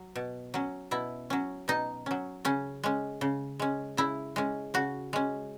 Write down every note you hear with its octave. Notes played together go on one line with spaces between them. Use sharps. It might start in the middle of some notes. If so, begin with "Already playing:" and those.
Already playing: F#3
B2
F#3 C#4
B2 E4
F#3 C#4
B2 D#4
F#3 C#4
C#3 C#4
G#3 C#4
C#3
G#3 C#4
C#3 E4
G#3 C#4
C#3 F#4
G#3 C#4